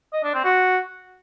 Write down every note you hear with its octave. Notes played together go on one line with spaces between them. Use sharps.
D#5
D4
C4
F#4